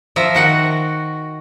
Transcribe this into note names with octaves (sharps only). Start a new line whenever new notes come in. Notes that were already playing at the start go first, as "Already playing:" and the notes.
F3 E5 A#5
D#3 F#4 F#5